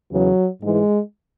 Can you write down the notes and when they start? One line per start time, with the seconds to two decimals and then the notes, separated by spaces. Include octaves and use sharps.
0.11 E2 C#3 E3 F#3
0.62 G#2 E3 G#3